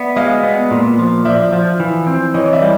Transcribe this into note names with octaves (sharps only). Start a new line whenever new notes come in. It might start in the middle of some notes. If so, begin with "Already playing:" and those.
Already playing: B3 D5 E5
G#3 D#5 F5
B3
A#2
F3
F3 D5 E5
F3
E3
C4
E3 C#5 D#5
D5 E5
G3